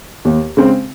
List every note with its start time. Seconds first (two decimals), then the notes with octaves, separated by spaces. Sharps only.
0.25 D#2
0.57 C#3 G#3 C4